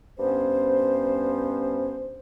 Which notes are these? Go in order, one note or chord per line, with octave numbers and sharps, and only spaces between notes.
G2 B3 C#4 C5